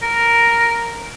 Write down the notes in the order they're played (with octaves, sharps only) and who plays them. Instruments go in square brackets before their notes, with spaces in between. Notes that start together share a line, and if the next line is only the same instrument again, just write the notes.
[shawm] A#4